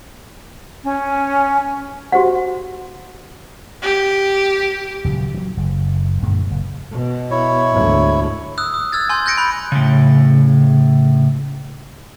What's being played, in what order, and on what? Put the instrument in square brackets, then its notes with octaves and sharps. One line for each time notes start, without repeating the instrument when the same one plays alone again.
[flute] C#4
[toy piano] F#4 G4 C5 F#5
[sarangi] G4
[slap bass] D#1 C#3 F#3
E3 F#3
F#1
F#2 A#2 D3 G#3
F#1
[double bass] B2
[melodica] E4 C#5
[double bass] D2 G#2
[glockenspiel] D#6 E6 F#6
D#6
E6 F6 G#6 A6
G#5 C6 G6
F#6 G6 A#6 C#7 D7
B5 F#6
[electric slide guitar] A2 C#3